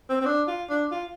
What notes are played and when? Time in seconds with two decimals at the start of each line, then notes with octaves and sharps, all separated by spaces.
0.09 C4
0.21 C4
0.26 D4
0.47 F4
0.70 D4
0.91 F4